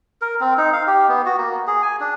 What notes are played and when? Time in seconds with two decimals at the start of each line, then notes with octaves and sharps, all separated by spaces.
0.21 A#4
0.41 C4
0.58 D#4
0.73 F5
0.87 G4
1.09 B3
1.26 F#4
1.38 A#3
1.67 G#4
1.82 G#5
2.00 D4